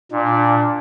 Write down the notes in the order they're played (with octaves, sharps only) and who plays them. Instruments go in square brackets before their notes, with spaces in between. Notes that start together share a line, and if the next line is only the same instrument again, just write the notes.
[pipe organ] A#2 [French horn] D4